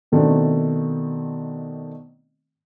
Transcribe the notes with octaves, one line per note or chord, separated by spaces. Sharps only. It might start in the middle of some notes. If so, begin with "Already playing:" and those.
B2 D#3 A3 C4 D4